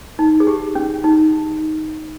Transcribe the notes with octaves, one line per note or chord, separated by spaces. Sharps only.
D#4
G#4
G4
C#4
D#4